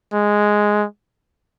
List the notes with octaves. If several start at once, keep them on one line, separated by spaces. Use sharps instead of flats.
G#3